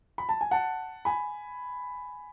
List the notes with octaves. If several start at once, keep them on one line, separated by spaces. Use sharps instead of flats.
B5
A5
G#5
F#5 A5
G#5 B5